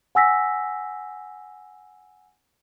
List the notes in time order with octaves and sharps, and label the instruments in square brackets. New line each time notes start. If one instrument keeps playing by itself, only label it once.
[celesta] F#5 G#5 E6 A#6 B6